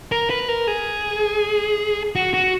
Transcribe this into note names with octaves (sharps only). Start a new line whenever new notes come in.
A#4
B4
A#4
G#4
F#4
F#4